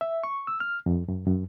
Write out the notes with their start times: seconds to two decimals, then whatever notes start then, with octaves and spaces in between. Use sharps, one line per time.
0.01 E5
0.24 C#6
0.47 E6
0.60 F6
0.86 F2
1.08 F#2
1.27 F#2